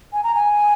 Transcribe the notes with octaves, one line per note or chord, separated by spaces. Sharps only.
G#5
A#5
G#5